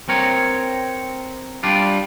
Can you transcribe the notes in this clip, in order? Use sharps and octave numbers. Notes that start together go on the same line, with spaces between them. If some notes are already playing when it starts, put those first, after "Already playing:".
C4 A#4 C#5
G3 D4 F4